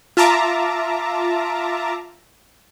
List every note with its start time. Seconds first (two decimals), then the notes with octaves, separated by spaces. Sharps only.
0.17 F4 E5 A5 A#5 D6